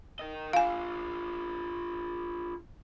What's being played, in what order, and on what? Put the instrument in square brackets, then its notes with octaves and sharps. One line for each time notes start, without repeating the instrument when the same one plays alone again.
[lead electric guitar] A#4 D#5
[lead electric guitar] D4 F4 [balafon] F5 G#5